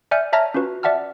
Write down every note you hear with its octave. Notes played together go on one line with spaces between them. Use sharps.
D5 E5 G#5 F6 G6 C#7
C#5 E5 A5 A#5 F6 A#6
C#4 F4 F#4 B4
D5 E5 F#5 A5 F6